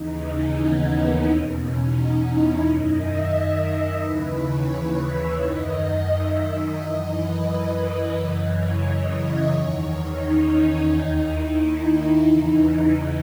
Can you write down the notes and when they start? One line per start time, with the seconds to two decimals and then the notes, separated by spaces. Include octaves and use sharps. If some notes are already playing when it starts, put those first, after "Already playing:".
Already playing: D#2 C#3 E3 D#4
0.23 C#4
0.57 B3
0.92 A#3
1.26 E2 B2
1.60 C#4
1.94 D#4
2.30 E4
2.63 F#2 D#3 D#5
2.98 E5
3.33 D#5
4.01 D#2 C#3 E3 B4
4.36 C#5
5.06 E5
5.39 F#2 D#3 D#5
6.08 E5
6.43 D#5
6.77 F#2 E3 D#5
7.12 B4
7.46 B4
8.16 F#2 C#3 E3
8.50 C#5
8.84 D#5
9.19 E5
9.53 E2 D#3 C#5
9.88 D#4
10.22 C#4
10.57 C#4
10.91 D#2 D#3 D#4
11.25 E4
12.28 E2 C#3 E3 D#4